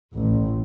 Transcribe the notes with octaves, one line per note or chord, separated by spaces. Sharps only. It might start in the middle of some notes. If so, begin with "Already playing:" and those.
A1